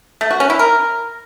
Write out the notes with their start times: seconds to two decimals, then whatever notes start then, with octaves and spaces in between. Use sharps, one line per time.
0.21 A3
0.31 F#4
0.40 C#4
0.50 E4
0.59 A#4